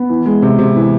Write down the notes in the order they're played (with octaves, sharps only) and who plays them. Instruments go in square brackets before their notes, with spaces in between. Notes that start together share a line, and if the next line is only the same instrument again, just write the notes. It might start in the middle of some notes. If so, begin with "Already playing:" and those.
Already playing: [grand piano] B3
E3
G#3
C3
C3
E3